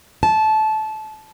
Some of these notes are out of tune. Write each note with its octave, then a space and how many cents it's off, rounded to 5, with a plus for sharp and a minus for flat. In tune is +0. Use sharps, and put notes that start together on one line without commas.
A5 -20